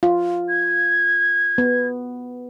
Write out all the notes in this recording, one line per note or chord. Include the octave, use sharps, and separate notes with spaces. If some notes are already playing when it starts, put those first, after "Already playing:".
F4
G#6
B3